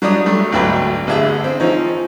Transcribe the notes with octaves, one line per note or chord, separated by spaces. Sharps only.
F#3 G3 D4 D#6
F#3 G3 A3
G#1 D2 F#3 B4 G5 B5
A1 D3 G#4 E5
C4
F3 C4 C#4 D#4